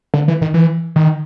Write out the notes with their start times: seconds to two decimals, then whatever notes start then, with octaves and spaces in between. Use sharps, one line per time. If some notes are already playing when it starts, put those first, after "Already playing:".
0.14 D3
0.28 E3
0.42 D#3
0.54 E3
0.96 D#3